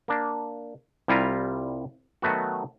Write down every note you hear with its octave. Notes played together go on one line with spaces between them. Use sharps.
A#3 D4
C2 G3 E4 F4 G#5 A#5
D#3 F#3 A3 B3 F#4